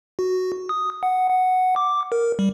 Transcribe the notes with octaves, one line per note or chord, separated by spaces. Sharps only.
F#4
D#6
F#5
F#5
D6
A#4
G3